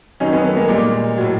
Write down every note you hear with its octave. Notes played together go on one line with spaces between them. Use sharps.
F#2 D#3 F#3 C#4 D#4
B3 C#4
A3 B3
G#3 A#3
A#2 G3
A2 F#3